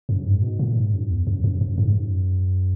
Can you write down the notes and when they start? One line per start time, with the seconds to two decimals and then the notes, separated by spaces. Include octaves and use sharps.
0.09 F#2
0.25 G#2
0.42 B2
0.59 A#2
0.76 G#2
0.94 F#2
1.11 E2
1.27 F#2
1.44 F#2
1.61 F#2
1.78 G#2
1.95 F#2